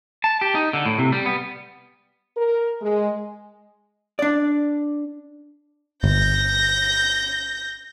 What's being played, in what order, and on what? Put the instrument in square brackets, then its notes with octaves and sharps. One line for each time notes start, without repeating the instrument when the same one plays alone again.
[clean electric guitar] A5
G4
D#4
D3
A2
C3
G3
B3
[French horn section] A#4
G#3
[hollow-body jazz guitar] D4 D5
[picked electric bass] G1 [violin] G6 A#6